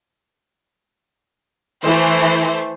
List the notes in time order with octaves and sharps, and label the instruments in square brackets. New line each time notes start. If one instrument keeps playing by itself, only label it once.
[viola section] E3 [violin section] A3 C5